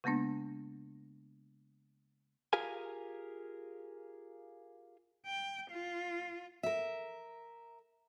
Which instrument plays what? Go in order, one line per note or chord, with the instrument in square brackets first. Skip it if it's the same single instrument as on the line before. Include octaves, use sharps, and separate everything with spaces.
[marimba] C#3 G#3 A#3 B3 D4
[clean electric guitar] F4 G4 G#4 A#4 F5 G#5
[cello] G5
F4
[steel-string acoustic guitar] A#4 E5